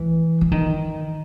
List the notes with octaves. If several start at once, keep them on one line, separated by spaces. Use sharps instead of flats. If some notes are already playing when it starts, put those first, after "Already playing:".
Already playing: E3
E3
D#3